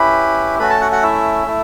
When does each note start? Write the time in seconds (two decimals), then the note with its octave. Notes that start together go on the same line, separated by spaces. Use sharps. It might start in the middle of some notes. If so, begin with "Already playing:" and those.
Already playing: C#4 E4 G4 B4 B5
0.59 A3 C#4 F#4 B4 B5
0.70 A4 A5
0.81 F#4 F#5
0.92 F#4 F#5
1.03 E4 E5
1.46 A3 E4